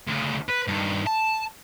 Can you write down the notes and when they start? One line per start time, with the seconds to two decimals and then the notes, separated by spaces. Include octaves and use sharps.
0.08 D2 C#3
0.50 B4
0.68 G2 D#3
1.07 A5